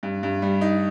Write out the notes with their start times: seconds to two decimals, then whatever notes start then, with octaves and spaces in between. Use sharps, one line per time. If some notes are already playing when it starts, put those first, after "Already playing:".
0.03 G2
0.23 G2
0.42 G3
0.61 D#4